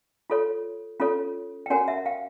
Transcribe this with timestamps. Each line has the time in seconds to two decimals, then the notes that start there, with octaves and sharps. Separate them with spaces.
0.30 F4 A4 C#5
1.00 C#4 F4 A4 C#5
1.66 G5
1.70 C#4 F#4 A#4 C#5 F#5 G#5
1.88 E5 F#5
2.06 F5 G5